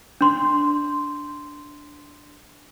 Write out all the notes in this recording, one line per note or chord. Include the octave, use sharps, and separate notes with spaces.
D4 C6